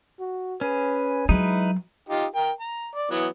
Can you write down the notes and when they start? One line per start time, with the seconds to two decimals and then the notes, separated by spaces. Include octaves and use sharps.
0.19 F#4
0.61 C#4 G#4 B4
1.29 F#3 G#3 D#4 E4 B4
2.09 D#4 F4 G4
2.36 A#4 G5
2.60 A#5
2.96 D5
3.11 E3 F#3 B3